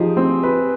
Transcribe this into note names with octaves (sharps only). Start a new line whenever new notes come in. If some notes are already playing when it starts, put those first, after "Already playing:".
Already playing: F3 D#4 G4 G#4
C4
B4